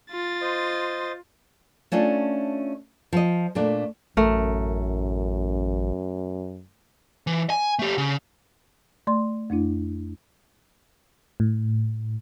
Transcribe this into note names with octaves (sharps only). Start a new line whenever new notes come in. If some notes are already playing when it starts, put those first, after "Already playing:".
F4 A6
C5 D#5
A3 C#4 D4 F4
F3 D#5
A#2 A3 D4
A1 F#2 A3 A#4
E3
G#5
A3 G4
C#3
A3 D5 C6
F2 A3 D4 E4
A2